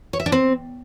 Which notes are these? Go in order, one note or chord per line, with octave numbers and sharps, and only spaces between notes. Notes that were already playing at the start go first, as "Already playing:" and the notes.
C#5
E5
D4
C4